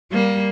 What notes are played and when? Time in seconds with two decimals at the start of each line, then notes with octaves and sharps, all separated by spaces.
0.12 G3 A#3